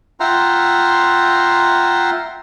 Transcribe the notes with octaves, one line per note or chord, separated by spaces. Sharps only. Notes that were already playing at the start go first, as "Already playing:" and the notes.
F4 E5 F#5 G5 A#5 C6